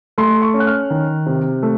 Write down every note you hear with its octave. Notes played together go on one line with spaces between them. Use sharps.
A3 C6
C#6
C#4
F#6
F6
D#3
C3
A3